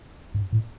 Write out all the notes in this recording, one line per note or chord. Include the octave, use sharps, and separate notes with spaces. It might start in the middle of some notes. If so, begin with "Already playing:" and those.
G2
A2